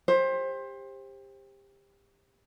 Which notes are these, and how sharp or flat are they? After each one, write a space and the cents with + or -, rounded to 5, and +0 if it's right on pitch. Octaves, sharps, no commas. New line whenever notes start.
G4 +25 C5 +20